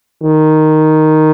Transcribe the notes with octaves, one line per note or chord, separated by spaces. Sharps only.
D#3